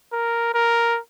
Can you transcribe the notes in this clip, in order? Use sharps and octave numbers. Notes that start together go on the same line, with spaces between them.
A#4
A#4